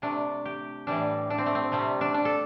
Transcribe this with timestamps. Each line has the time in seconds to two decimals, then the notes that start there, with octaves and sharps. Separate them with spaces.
0.02 C3 A3 D4
0.45 G4
0.87 A2 E3 G3 D4
1.30 D4
1.38 C4
1.46 A3
1.55 C4
1.72 C3 G3 A3
2.01 D4
2.14 D4
2.25 A4